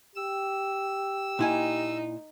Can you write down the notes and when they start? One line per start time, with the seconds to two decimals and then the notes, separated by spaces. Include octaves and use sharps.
0.16 G4 E6
1.39 A#2 D#4 E4 G#5